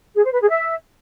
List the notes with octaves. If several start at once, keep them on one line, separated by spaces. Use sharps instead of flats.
G#4
C5
B4
G#4
E5